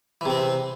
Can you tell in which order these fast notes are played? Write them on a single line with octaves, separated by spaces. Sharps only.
E3 C3 C4